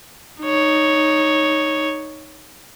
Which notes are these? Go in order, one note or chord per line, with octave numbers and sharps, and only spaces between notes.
D#4 C#5